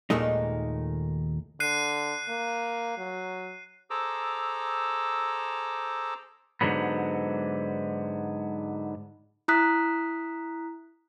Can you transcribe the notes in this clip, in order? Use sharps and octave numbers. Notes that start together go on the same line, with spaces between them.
D#2 A#2 D#3 G#3 A3 D#4
D3 F#6 C7 D#7
A#3
F#3
G#4 A4 C5 A#5 D6 E6
G#2 D3 F#3 B3
E4 A#5 D#6 F#6 B6